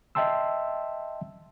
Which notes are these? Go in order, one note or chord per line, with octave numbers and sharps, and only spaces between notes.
D#5 E5 G5 A5 C6 E6